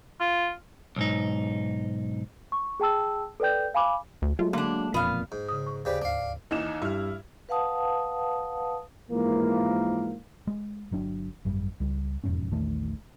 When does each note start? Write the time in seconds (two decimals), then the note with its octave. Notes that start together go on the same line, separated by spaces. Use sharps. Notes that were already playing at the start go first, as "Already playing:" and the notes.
0.20 F4
0.96 B1 G#2 D#4
2.52 C#6
2.80 G#4 G5 A5 E6
3.40 A4 B4 D5 G5 G6
3.74 F5 G#5 B5 D6
4.22 D2
4.39 F#3 G#3 A3 F4
4.53 D3 A#3 D4
4.94 E1 F2 A#2 B3 F5
5.32 G#2
5.49 C#3 D#6
5.67 C#6
5.85 D#2 C#3 G4 B4 C5 D5
6.02 D2 G#2 D4 F5
6.51 D#2 E3 D#4 E7
6.82 G2 E4 F6
7.49 B4 F5 F#5 A5 D#6
9.11 G#2 E3 F3 A#3
10.47 G#3
10.91 G1 F#3 D4
11.45 G#1 F#2 G3
11.80 C#2 G3
12.24 E1 F2 G#2 C#4
12.51 A#1 E2 D#3 A3